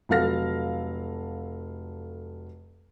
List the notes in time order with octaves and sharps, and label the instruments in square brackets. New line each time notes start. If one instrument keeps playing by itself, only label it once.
[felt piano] F1 F#3 A4 F5 F6 A#6